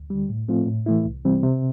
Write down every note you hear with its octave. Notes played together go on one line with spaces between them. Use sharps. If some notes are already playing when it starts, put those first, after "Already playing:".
Already playing: D2
D3 G3
A2
F3 A3 C4 F4
A2
E3 A3 E4
C2
C3 E3 G3 C4
C3